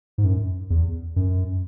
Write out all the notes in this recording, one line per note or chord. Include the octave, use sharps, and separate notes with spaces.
G#2
F#2
E2
F#2